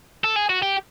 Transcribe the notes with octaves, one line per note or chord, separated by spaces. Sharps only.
A4
G#4
F#4
G4